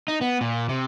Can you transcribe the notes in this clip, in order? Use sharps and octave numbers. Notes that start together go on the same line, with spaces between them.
D#4
B3
A#2
C3